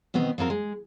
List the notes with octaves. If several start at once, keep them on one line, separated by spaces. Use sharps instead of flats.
B2 D#3 B3 C4
F3 F#3 C4 A#4
G#3